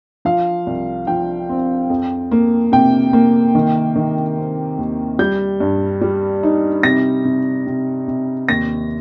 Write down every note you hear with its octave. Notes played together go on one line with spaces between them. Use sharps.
F3 F5
C2
F3 G5
C4
F2
A#3
C3 G5
A#3
D#3
D#3
C4
D#2
G3 G6
G2
G3
D#4
C3 A#6
C3
C3
C3
D#2 A#6